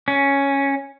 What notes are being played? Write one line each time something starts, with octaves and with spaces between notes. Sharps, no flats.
C#4